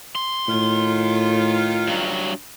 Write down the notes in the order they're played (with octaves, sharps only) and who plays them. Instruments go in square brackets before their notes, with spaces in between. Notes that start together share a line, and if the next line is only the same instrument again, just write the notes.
[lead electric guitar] C6
[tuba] A2 [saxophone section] D#3 F4
[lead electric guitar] G2 F#3